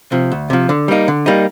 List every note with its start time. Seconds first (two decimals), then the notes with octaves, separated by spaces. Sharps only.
0.12 C3 F3
0.32 D2
0.50 C3 F3
0.69 D3
0.88 G3 A#3 D#4
1.08 D3
1.26 G3 A#3 D#4